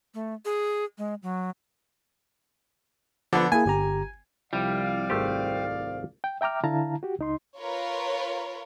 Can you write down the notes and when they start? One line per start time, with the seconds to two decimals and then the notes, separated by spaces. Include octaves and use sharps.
0.14 A3
0.45 G#4
0.98 G#3
1.23 F#3
3.33 D3 F3 B3
3.52 A#3 E4 G#4 G#5
3.66 G1 G4 A#5
4.53 C2 C3 F3 G3 E4 D5 F5
5.10 G#1 A3 G4 C5
6.24 G5
6.41 E5 G5 A#5 D6 F6
6.64 D3 E4 F5 A5 A#5
7.03 F#4 G4
7.19 C#2 D#4 C6
7.59 F4 A#4 B4 C#5